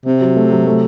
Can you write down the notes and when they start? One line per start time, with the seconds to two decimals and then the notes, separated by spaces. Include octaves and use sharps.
0.06 C3 C4
0.21 F#3
0.36 A3
0.51 F#3
0.66 A3